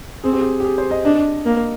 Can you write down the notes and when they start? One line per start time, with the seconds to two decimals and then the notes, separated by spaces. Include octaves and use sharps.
0.24 C4 G#4
0.33 G4
0.41 G#4
0.60 G4
0.65 G#4
0.78 C5
0.91 D#5
1.05 D4 D#5
1.46 A#3